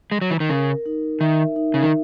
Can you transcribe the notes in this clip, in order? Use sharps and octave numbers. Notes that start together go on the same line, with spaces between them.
G#3
F#3
E3
D#3
C#3 A#4
D#4
D#3 E5
D#4
C#3
D#3